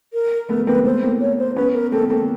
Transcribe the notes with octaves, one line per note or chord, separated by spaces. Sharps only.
A#4
A3 B3 A#4
A#3 C4 B4
A3 B3 C5
A#3 C4
C#5
C5
B3 C#4 B4
A#4
A#3 C4 A4
A#3 C4 A4